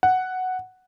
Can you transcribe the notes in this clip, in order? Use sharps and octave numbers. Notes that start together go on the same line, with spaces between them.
F#5